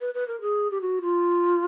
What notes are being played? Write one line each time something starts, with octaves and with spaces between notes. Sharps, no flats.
B4
B4
A#4
G#4
G4
F#4
F4